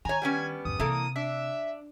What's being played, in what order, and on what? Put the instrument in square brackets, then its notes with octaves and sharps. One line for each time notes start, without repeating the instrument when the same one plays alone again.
[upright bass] D#3 [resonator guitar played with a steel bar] C#5 A#5 [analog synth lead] G#5
[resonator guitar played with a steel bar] G3 B3 C#4
[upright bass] G#1 F2 [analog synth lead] D#6
[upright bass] C3 [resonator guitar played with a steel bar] E3 A#3 A4
[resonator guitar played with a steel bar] D4 [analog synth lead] E5